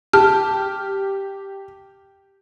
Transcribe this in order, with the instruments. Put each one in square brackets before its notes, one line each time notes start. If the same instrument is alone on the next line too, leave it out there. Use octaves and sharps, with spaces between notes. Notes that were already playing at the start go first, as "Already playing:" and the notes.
[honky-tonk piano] G4 [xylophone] A5 F6